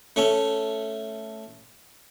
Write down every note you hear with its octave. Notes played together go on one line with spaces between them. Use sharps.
A3 C#4